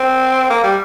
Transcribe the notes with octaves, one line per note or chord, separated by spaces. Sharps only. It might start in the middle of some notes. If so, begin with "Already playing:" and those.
Already playing: C4
A#3
G3